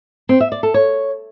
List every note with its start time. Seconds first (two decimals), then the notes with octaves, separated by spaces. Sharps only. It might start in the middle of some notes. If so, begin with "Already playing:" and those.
0.29 C4
0.40 E5
0.52 D5
0.63 A4
0.74 C#5